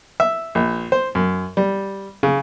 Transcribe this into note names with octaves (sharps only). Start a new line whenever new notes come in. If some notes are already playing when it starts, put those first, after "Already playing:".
E5
A#1
C5
F#2
G3
C#3